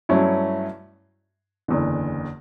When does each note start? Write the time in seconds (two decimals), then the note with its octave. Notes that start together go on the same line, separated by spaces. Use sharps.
0.09 G2 F#3 A3 C#4 E4
1.68 F#1 E2 D3